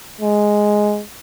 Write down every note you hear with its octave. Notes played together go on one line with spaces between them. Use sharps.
G#3